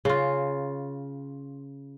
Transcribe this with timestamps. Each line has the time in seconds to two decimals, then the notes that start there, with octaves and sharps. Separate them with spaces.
0.05 C#3 F4